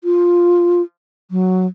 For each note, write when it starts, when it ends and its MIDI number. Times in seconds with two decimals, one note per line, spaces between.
0.04 0.82 65
1.31 1.66 54